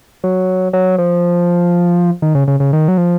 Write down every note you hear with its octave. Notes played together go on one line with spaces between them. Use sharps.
F#3
F#3
F3
D#3
C#3
C#3
C#3
D#3
F#3
F3